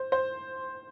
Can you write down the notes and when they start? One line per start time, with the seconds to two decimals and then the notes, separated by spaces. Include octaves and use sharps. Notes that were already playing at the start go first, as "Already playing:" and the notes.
Already playing: C5
0.12 C5